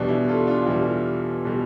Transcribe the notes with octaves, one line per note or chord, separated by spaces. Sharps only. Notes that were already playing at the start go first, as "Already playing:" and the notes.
Already playing: E2 B2 G3 D4
E4
F4 A4
D4 F4
E2 B2 G3 E4
B2 G3